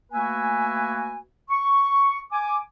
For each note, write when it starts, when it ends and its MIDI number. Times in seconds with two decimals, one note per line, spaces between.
0.13 1.18 57
0.13 1.18 58
0.13 1.18 66
0.13 1.18 71
0.13 1.18 76
0.13 1.18 80
1.50 2.21 85
2.32 2.58 80
2.32 2.58 86